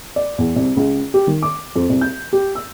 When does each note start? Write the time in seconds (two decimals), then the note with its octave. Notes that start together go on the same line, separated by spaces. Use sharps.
0.16 D5
0.38 E2
0.56 C2
0.77 C#2
1.14 G4
1.27 D#3
1.43 D6
1.76 F2
1.89 C2
2.01 G6
2.33 G4
2.55 E6